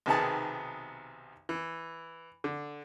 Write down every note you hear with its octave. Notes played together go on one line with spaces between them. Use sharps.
B1 C3 D#3 B3 G#4 A5
E3
D3